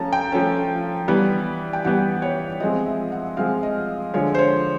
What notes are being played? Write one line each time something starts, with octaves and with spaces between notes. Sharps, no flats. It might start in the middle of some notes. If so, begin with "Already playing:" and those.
Already playing: F3 A3 C#4 A5 A#5
G5
F3 A3 C#4
E3 G3 B3
G5
E3 G3 B3 F#5
C#5
F3 G#3 C4 D#5
E5
F#5
F3 G#3 C4 F5
D#5
D3 F3 G#3 C#5
C5
C#5